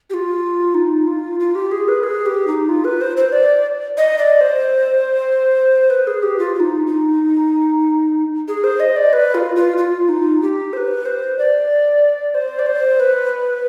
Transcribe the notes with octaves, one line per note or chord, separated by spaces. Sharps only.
G4
F4
D#4
F4
F4
G4
G#4
B4
G#4
G4
D#4
F4
B4
C5
C5
D5
D#5
D5
C5
B4
G#4
G4
F4
F4
D#4
D#4
G#4
C5
D#5
D5
B4
F4
F4
F4
D#4
G4
C5
B4
C5
D5
C5
D5
C5
B4